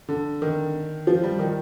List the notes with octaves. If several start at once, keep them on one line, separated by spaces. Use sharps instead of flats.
D3
D#3
F3
G3
D#3